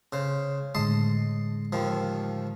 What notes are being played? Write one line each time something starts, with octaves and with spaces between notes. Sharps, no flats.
C#3 C5
A2 D3 G#3 D#5 A5 C6
D#2 D#3 F3